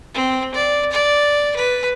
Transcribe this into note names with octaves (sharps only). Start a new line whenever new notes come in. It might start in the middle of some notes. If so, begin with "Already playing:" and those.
C4
D5
D5
B4